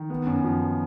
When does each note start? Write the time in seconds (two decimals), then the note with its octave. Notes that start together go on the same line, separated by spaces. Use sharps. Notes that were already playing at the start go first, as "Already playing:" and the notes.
Already playing: D#3
0.10 B3
0.27 F#2
0.44 F3